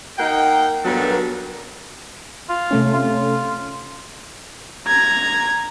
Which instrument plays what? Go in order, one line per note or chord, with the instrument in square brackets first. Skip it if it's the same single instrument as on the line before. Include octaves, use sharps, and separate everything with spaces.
[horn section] A#3 D#4 F#5 G5
G2 A#2 F#3 B3 A4 A#4
[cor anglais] F4
[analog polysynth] C3 A3 C#4
[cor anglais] F4
[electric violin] A#5 G#6